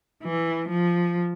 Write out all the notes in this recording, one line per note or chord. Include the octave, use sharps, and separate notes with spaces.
E3
F3